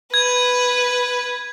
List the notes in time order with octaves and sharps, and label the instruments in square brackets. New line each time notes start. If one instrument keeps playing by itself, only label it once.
[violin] B4 [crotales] G#6